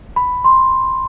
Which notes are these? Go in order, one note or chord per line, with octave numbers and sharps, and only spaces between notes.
B5
C6